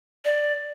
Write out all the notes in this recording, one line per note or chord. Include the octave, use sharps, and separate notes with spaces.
D5